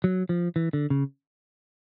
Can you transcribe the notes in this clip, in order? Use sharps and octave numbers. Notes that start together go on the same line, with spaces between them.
F#3
F3
E3
D3
C#3